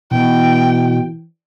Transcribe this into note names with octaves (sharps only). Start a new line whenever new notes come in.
B2 E3 G5